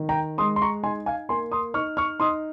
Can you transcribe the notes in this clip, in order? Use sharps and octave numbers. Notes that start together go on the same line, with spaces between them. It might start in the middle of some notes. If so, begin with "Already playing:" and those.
Already playing: D#3
G5 A#5
G#3 C6 D#6
C6
A#5 C#6
D#4 G#5 C6
F5 G#5
A#3 G#5 C6
C6 D#6
D#4 C#6 F6
C#6 F6
D#4 C6 D#6